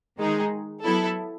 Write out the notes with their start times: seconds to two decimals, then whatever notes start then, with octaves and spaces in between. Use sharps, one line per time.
0.18 D#3 G#3 D#4 G#4
0.83 F#3 B3 E4 A4